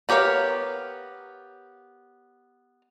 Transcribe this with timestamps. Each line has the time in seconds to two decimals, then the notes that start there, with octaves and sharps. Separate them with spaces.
0.09 B3 G4 A#4 C#5 F5